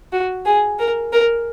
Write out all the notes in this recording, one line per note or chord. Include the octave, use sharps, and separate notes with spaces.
F#4
G#4
A#4
A#4